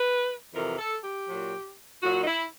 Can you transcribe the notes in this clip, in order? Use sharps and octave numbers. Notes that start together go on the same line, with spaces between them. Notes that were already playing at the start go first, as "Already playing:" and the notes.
Already playing: B4
F2 C3 E3 A#4
A4
G4
A#2 F#3
A#2 F#3 F#4
D#4
E4